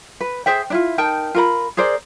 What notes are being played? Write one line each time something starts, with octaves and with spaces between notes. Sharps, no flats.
B4
G#4 C5 E5 G5
D4 E4 F4
D#4 A#4 G5 A5
F4 A#4 B5
G#4 A#4 C5 D5